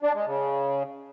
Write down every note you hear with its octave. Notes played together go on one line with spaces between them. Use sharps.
D4
G#3
C#3